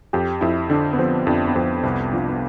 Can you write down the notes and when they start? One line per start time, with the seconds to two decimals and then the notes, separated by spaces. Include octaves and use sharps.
0.13 F2 G4
0.41 F2 E4
0.70 D3 D4
0.93 B3
0.98 F3 C4
1.27 F2 D4
1.47 B3
1.55 F2 C4
1.83 C2 B3
2.12 F3 D4
2.29 B3